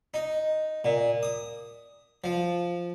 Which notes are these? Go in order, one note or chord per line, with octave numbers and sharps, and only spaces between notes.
D#4
A#2
D#6
F3